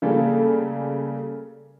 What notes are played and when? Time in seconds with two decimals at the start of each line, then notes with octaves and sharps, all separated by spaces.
0.02 C#3 G3 A3 A#3 G#4 A4